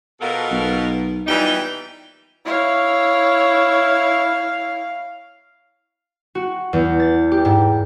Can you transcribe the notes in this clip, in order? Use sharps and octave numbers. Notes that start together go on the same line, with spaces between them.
B2 F4 A4 A#4
B1
A#2 E3 G3 D#4 G5
E4 C#5 F5
F#4
E2
A6
G4
G#2